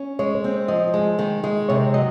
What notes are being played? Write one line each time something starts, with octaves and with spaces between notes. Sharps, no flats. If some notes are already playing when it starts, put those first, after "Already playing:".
Already playing: C#4
G#3 C#5
C4
F3 D#5
G#3
D#3
G#3
C3 C#5
F#3 D#5